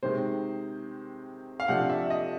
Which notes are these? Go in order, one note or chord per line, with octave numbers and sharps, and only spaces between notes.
C3 D#3 G#3 C5
F5
C3 F3 A3 D4 F#5
E5
E5
D#5